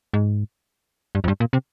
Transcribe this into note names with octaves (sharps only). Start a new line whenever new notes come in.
G#2
G2
F2
G2
A#2
C3